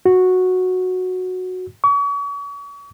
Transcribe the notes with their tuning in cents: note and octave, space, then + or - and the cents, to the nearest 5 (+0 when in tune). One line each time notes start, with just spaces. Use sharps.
F#4 -10
C#6 +40